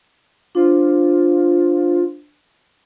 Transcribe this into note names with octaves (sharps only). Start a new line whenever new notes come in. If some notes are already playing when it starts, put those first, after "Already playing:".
D4 F4 C5